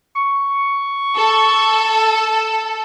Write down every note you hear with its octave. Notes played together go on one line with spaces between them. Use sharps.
C#6
A4